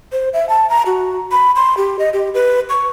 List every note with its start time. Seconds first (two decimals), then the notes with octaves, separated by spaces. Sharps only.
0.12 C5
0.33 E5
0.49 A5
0.70 A#5
0.86 F#4
1.31 B5
1.56 C6
1.77 G4
1.99 D#5
2.13 G4
2.34 B4
2.70 C#6